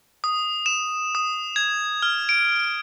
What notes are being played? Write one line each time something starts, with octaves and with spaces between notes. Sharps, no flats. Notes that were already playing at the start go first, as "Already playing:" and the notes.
D#6
E7
D#6
G#6
F6
D7